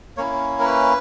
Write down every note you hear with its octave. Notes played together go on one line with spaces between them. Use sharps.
A#3 C#4 E4 C#5
A#4
B4